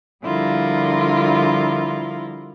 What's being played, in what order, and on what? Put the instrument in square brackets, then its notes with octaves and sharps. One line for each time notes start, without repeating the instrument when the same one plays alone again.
[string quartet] D3 F3 G3 E4 F4 A#4